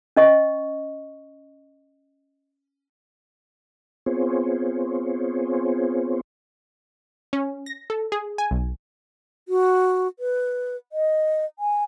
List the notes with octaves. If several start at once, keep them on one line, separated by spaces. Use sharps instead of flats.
C#4 D#5 C#6
B3 C4 F4 G#4 C5 C#5
C#4
A#6
A4
G#4
G#5
B1
F#4
B4
D#5
G#5